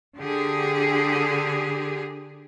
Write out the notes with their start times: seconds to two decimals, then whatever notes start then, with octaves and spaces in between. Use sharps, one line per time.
0.19 D3 G4 G#4